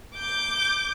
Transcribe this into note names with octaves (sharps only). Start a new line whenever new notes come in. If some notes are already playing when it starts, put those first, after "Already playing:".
D6 G6